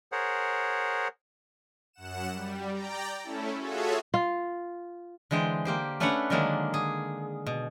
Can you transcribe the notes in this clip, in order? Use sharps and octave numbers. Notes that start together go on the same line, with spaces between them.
G#4 A#4 C5 C#5 F#5
F#2 F#5 E7
G3
D5 G5 A#5
A3 C#4 E4 A4
F4 F#4 G#4 A4 C#5 E5
F4
D3 E3 G#3 C5 G5
A#3 G4 C5
A3 C#4 D4 B4 C#5 F#5
D3 D#3 F#3 G#3 A#3 D4
G#4
B2